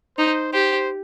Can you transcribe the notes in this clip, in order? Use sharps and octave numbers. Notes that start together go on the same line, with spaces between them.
D#4 C5
G4 C5